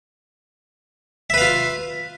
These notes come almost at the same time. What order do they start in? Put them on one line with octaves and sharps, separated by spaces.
E5 B4 F5 F4